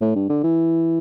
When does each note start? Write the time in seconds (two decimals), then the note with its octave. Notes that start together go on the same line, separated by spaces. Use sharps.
0.01 A2
0.15 G2
0.29 D3
0.43 E3